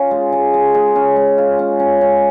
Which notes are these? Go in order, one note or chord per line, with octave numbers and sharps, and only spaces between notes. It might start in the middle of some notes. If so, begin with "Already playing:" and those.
Already playing: C#4 F4
G#3
G#3
G#3
G#3
C#4
G#3
F4
C#4
C#4
C#4